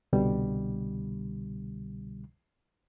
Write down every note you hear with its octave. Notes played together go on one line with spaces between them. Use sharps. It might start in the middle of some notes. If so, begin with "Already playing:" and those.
C2 B2 D3 G3